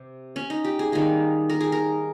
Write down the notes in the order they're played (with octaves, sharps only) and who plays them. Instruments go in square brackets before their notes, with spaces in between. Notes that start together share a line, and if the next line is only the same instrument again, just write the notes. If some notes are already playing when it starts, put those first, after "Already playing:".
Already playing: [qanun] C3
C#4
D#4
G4
G#4
D#3 G3 A#3 G#4
A#4
G#4
A#4